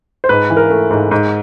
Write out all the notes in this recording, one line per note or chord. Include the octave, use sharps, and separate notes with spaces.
C5
G#2 B4
E3
A#4
A3
G#2
G#2